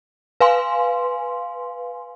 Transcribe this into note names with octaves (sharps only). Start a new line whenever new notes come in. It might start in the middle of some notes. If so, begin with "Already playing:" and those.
B4 F5 G#5 C6